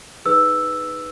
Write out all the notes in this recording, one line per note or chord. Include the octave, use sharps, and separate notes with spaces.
D#4 G#4 B4 E6